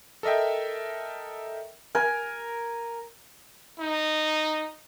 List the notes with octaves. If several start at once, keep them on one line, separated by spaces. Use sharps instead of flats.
A4 A#4 D#5 E5 G5
A#4 G#5
D#4